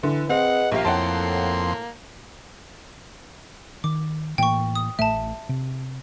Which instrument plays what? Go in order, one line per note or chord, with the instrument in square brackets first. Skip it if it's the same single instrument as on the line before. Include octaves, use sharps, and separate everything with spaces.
[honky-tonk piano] D3 [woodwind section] E3
[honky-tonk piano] C4 [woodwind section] G#4 B4 D#5 [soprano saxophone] F#5
[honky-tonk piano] A#1 G4 F5 [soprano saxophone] A#3
[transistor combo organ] F2 C6 [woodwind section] A2 [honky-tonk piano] F#5 G5 A5
[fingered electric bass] D#3 [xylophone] D6
[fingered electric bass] A2 E3 A#3 [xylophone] G5 C#6
[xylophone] D#6
[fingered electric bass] A1 A2 A3 [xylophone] E5 A5
[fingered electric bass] C3